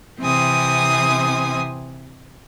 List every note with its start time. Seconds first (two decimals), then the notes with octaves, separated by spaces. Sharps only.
0.20 C3 E3 C4 G#5 D#6